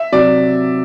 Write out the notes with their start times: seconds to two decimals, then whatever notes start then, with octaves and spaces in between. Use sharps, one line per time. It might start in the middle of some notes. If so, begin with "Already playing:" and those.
Already playing: E5
0.12 C3 F#3 D5